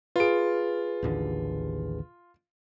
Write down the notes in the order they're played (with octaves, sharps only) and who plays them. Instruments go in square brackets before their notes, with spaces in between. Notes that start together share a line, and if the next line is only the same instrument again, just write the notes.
[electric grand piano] F4 D7 [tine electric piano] G#4 B4
[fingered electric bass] A1 D#2 D3